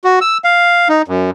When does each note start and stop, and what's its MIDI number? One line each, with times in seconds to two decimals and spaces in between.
0.04 0.19 66
0.21 0.38 88
0.44 0.88 77
0.89 1.02 63
1.08 1.30 42